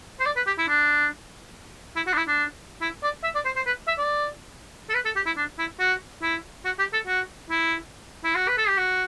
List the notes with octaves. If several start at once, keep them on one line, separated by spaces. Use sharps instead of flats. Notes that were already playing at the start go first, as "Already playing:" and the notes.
C5
D5
B4
G4
E4
D4
E4
F#4
D4
E4
D4
E4
D5
E5
D5
C5
C5
B4
E5
D5
A4
B4
A4
G4
E4
D4
E4
F#4
E4
F#4
G4
A4
F#4
E4
E4
F#4
B4
A4
G4
F#4